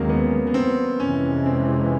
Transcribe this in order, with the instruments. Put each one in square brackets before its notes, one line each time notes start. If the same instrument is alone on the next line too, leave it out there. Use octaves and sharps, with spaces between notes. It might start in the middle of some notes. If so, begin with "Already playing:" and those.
Already playing: [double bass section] D#2 D#3 G#3 [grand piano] F#3 A#3 C4 C#4
[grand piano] B3
B3
C4
[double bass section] F2 C3 E3 G#3 [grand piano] C#4
[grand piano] C4